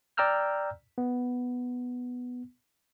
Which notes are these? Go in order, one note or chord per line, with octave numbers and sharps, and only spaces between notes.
D5 G5 A#5 E6 F6 G6
B3